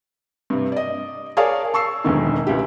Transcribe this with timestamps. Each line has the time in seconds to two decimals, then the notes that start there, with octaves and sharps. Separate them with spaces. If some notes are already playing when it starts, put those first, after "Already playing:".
0.50 G2 C3
0.72 D5 D#5
1.37 G#4 A#4 C#5 D5 F5 A5
1.74 A5 C#6 E6 C7
2.04 E1 B1 D3 D#3
2.47 C#2 E4 G4